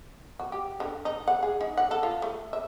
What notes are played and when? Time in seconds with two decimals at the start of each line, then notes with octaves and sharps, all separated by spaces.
0.39 F#4
0.52 G4
0.80 D3
1.05 D#4
1.28 F#5
1.43 G#4
1.61 D#4
1.77 F#5
1.91 A4
2.03 F4
2.22 A3
2.53 E5